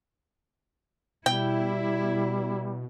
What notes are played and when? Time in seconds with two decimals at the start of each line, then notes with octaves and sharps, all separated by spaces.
1.26 B2 G3 E4 G5